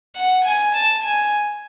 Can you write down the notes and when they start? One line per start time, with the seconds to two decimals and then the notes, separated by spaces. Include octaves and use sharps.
0.15 F#5
0.45 G#5
0.75 A5
1.03 G#5